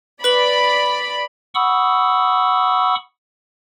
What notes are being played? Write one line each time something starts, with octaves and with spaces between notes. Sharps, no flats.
B4 D5 B5 F#7
F#5 B5 C#6 D#6 E6